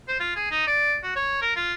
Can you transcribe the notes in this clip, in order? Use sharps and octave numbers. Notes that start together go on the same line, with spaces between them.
C5
F4
G#4
D#4
D5
F#4
C#5
A#4
F4